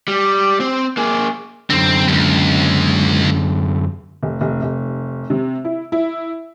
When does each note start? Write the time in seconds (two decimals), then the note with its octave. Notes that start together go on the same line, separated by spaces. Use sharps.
0.08 G3
0.60 C4
0.97 A#3 G#4
1.70 F#2 D3 C4
2.08 C#2 G2
4.23 F1
4.41 F1
4.62 F1
5.30 C3
5.65 E4
5.92 E4